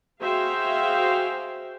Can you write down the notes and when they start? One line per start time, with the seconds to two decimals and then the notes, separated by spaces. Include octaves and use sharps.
0.21 F#4 G#4 C5 E5 F5 G5